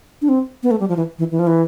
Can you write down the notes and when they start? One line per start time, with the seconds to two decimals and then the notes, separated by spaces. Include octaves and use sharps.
0.22 D4
0.29 C4
0.63 B3
0.71 A3
0.80 G3
0.89 F3
0.97 E3
1.19 E3
1.31 E3
1.39 F3
1.47 E3